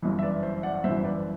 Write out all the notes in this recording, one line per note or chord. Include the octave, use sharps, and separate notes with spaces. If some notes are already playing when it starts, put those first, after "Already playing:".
G1 F#2 E3
E5
B4 D5
C5 E5
D5 F#5
F#5
G1 F#2 E3 C5 E5
B4 D5